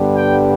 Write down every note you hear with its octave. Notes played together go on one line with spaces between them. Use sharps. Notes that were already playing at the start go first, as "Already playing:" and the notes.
Already playing: G2 D3 G3 B3
G5